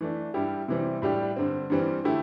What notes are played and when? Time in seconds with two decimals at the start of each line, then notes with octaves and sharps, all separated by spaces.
0.01 E3 A3 D4
0.34 G2 G3 E4 G4
0.68 C3 E3 G3 C4
1.02 A2 G3 D4 G4
1.36 G2 D3 C4
1.70 G2 E3 G3 C4
2.04 D3 A3 E4 G4